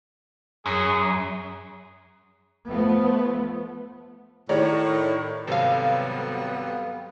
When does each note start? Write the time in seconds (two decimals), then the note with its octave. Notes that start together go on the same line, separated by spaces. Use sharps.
0.66 F#2 G#4
2.68 F3 A3 B3
4.49 A2 D#3 G4 C#5 D5 A#5 C#6
5.47 G#1 C3 F#3 G3 B3 A4 F5